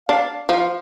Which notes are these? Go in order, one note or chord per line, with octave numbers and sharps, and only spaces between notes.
D4 F5
F3 F5
F5